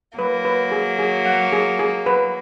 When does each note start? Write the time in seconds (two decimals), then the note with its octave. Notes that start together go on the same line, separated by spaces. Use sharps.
0.18 F#3 A#3 B4
0.45 B4
0.72 G#4
0.99 G#4
1.26 F#5
1.52 G#4
1.79 G#4
2.06 B4